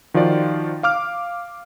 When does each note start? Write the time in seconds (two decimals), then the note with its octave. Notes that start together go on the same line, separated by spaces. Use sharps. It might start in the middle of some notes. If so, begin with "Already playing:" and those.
0.14 D#3 F3 F4 F#4 D5
0.83 F5 D6 F6